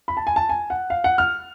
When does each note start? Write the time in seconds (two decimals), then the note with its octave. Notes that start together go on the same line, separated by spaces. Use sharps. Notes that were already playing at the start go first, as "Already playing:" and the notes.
0.08 B5
0.17 A5
0.27 G#5
0.36 A5
0.49 G#5
0.70 F#5
0.90 F5
1.04 F#5
1.18 F6